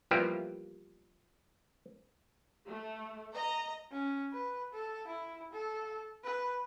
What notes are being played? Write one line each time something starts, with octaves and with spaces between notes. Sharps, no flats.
E3 F3 G3 A#3 B3 G4
A3
D#5 A#5
C#4
B4
A4
E4
A4
B4